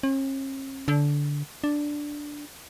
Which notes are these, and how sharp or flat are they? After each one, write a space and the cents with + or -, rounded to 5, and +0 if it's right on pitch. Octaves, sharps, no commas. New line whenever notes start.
C#4 -45
D3 -15
D4 +0